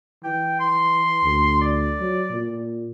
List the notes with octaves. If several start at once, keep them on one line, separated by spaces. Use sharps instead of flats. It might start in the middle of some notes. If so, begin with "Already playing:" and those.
E3 G5
C6
D2
D5
F#3
A#2